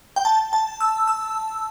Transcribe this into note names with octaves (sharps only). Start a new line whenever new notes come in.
G5
A5
A5
E6
E6